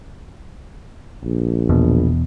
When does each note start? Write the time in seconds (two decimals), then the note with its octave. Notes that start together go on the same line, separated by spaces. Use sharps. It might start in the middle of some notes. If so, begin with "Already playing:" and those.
1.23 A#1
1.69 E2 B2